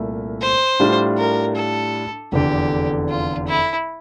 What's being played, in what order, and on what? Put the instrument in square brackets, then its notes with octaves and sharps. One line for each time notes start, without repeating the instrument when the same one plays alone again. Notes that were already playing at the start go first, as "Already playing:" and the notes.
Already playing: [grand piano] C2 A#2 A3 E4
[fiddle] C5
[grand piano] A2 G3 D4 F4
[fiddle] A#4
A4
[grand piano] F1 E2 D3 [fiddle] G4
[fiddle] F4
E4